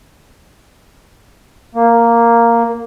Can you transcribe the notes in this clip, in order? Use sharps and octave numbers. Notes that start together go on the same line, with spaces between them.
A#3